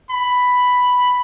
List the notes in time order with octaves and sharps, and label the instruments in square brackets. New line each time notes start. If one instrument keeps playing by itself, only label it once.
[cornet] B5